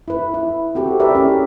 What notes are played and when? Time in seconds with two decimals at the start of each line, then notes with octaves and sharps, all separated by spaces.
0.08 E4 B4
0.34 E4
0.75 C4 F#4 G4 A4
1.00 E4 G4 A#4 B4 D5 E5
1.15 C#4 G4
1.28 G#4